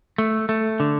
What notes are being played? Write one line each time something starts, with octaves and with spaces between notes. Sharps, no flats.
A3
A3
D3